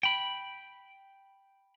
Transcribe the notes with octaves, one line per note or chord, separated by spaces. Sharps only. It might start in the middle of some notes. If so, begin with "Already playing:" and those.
G5 B5